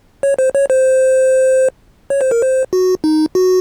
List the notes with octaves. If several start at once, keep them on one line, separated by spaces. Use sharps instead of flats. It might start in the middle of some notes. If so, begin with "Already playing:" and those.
C#5
C5
C#5
C5
C#5
C5
A#4
C5
F#4
D#4
F#4